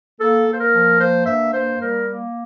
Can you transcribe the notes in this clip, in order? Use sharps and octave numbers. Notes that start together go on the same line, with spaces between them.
A#3 A4
A#3
C5
A#4
F3
A#3 C5
G2 E5
A#3 C5
G3 A#4
A#3